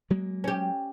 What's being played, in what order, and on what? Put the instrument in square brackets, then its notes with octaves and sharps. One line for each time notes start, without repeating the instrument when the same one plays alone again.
[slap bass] F#3 G#3 A#3
[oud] C#4 G4